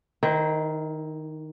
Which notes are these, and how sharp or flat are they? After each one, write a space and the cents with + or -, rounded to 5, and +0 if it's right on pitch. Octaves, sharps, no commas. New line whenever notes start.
D#3 +0 E4 -35 C5 -25